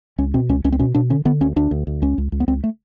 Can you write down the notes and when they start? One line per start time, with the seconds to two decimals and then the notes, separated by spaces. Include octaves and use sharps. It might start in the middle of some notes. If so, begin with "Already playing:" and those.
0.18 C#2 C#4
0.34 B2 C4
0.49 C#2 C#4
0.64 C#2 C#4
0.72 C4
0.79 B2 C#4
0.95 B2 D4
1.10 D3 C#4
1.25 D3 B3
1.41 D2 C#4
1.56 D2 D4
1.71 D2
1.87 D2
2.02 C#2 C#4
2.18 C#2
2.32 C#2
2.40 B3
2.48 C#2 C4
2.64 A3